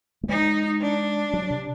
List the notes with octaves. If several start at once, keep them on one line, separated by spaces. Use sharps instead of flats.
A3
G#3 D#4
D4
F#3
C3